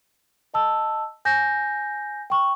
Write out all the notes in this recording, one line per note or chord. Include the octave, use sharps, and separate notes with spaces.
D#5 A5 E6
G#5 G6 A#6
G5 C#6